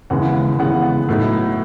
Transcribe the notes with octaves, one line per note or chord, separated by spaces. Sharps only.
D#2 C#3 E3 G#3 B3 F#5
D#2 C#3 E3 G#3 B3 F#5
A2 F#3 B3 D#4